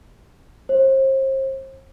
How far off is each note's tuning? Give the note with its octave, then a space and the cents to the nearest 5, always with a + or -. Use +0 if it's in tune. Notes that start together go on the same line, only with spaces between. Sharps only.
C5 +35